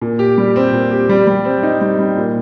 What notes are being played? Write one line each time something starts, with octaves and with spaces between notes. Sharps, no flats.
A#2
G4
G3
C4
A#2
G4
G3
G3
C4
D#4
G3
G3
A#2